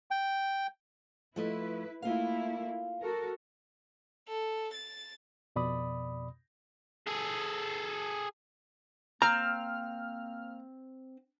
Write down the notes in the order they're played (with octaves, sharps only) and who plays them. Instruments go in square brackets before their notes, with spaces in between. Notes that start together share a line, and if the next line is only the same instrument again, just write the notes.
[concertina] G5
[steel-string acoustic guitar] F3 A3 D#5 [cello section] E4 B4
[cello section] A3 A#3 E4 [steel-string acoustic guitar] F4 F5
[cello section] F#4 A4 A#4
[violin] A4
A6
[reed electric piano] F2 B2 D5 B5 D#6
[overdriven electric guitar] G#4 A4
[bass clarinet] A#3 [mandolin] C4 [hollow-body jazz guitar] A#5 [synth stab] F6